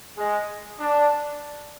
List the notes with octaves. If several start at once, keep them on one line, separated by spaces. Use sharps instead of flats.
G#3
D4